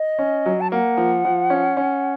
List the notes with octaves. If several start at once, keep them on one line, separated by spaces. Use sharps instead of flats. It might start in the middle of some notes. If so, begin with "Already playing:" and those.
Already playing: D#5
C#4
F#3
A5
A#3 F#5
F3
F3
C#4
C#4